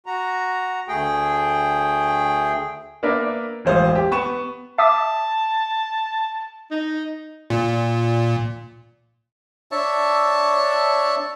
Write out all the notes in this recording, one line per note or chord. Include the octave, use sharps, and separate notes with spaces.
F#4 A#5
D2 A3 G#4 G5
A#3 B3 D4 A#4 D5 E5
E1 A1 C5 F5 D#6
G4
B3 C#6 E7
E5 A5 D6 D#6
D#4
A#2
D4 C#5 E5 A5